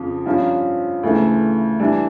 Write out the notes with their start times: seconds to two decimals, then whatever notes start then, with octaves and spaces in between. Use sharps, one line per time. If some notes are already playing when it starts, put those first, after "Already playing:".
Already playing: F2 C#3 F3
0.25 G2 F3 C#4 F4
1.03 D2 C#3 E3 A3
1.80 E3 G3 D4